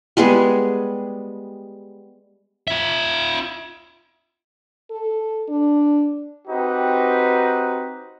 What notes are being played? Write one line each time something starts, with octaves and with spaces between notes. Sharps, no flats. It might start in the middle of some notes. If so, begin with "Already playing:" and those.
G3 G#3 B3 G#4
F4 E5
A4
D4
C4 D#4 F#4 G4 B4